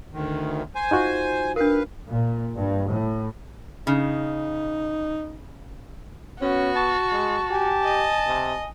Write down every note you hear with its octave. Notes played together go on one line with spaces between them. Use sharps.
D2 D#3
C5 G#5
D#4 F4 F#4
D4 A#4 B4 F5
A#2
G2
A2
C#3 D#4
B3 C#4 F#4
A5 C#6
G#3
G4 G#5
D#5
C3